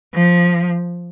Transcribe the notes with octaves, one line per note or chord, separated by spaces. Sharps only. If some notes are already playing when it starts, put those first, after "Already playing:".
F3